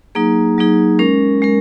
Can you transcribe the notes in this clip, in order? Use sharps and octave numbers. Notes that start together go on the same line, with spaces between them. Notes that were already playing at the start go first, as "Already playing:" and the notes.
F#3 A#3 D#4 G#4
F#3 A#3 D#4 G#4
G#3 C#4 A#4
G#3 C#4 A#4